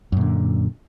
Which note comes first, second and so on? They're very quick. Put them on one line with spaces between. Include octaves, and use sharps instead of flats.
F#2 A#2 D3